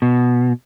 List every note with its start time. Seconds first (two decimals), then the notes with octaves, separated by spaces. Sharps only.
0.02 B2